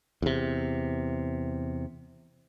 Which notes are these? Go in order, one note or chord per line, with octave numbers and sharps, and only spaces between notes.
E2 C3